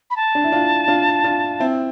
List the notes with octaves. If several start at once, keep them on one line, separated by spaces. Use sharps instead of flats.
B5
A5
D4
E4
D4 F4
D4 F4
D4 F4
C4 E4